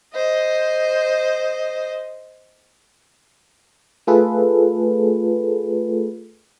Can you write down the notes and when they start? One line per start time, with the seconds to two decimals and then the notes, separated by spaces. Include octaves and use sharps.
0.14 C5 D#5
4.07 A3 F4 G#4 A4 B4